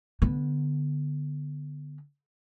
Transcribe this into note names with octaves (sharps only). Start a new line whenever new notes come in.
D3 B3